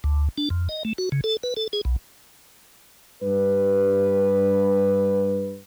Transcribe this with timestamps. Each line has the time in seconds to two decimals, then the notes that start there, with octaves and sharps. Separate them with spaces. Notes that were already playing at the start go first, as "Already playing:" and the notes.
0.04 D2
0.38 D4
0.50 F2
0.69 D#5
0.85 A3
0.98 F#4
1.12 C#3
1.24 A4
1.43 B4
1.57 A4
1.73 G#4
1.85 B1
3.22 G2 B4